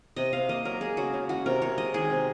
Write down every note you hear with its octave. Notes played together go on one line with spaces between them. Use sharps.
C3 D#5
C3 F5
A#3 D#5
F#3 A#4
G#3 G#4
C#3 F#4
C#3
G#3 F#4
C3 A#4
C3 C#5
G#3 D#5
D#3 G#4
C3